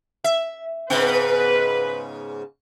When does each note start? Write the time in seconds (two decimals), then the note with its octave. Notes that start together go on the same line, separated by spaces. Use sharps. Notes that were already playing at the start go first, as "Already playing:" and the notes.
0.24 E5
0.90 G#2 C#3 B3 B4